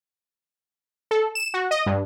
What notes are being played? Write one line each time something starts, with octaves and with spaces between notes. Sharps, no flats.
A4
E7
F#4
D#5
G2